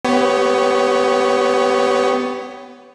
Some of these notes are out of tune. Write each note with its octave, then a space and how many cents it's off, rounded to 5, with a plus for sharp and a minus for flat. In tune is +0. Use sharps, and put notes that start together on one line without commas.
B3 +15 G4 -10 C#5 +0